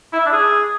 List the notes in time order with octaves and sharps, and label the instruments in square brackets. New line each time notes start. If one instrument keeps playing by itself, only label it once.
[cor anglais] E4
E5
D4
G#4